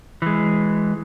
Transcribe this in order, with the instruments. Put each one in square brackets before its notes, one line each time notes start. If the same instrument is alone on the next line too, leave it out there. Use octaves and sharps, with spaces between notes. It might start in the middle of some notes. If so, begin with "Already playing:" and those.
[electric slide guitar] E3 G#3